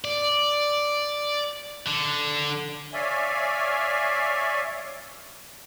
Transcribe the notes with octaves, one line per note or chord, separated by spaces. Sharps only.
D5
D3
C#5 D5 E5 F5 G#5